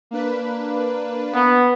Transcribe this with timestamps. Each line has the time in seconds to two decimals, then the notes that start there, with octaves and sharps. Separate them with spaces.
0.11 A#3 D4 B4
1.34 B3